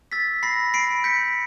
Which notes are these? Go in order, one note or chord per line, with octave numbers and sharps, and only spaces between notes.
E6 A6 B6
B5 A#6 C7
B5 C7 D7
G6 B6 C#7